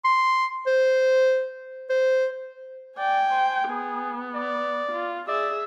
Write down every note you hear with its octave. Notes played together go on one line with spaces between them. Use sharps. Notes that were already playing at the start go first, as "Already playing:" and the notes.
C6
C5
C5
D5 G5 G#5
C5
B3 G#4
D5
F4
G#4 D5 E5